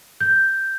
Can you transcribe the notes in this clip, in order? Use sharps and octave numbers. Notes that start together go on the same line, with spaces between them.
G6